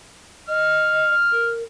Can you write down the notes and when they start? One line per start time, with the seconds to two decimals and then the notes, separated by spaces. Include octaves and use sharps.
0.48 D#5 F6
1.32 A#4